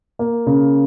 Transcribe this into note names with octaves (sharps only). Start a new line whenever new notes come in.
A#3
C#3